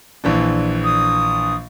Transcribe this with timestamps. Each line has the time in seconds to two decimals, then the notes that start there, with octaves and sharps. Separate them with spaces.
0.24 A#1 E3 D4
0.84 D#6